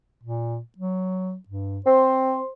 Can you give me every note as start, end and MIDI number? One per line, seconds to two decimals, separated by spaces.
0.23 0.59 46
0.78 1.36 54
1.48 1.80 43
1.86 2.38 60
1.86 2.51 72